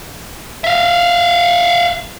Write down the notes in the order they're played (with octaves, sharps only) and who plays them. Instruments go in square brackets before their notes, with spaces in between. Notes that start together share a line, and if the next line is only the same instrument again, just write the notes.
[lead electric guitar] E5 F5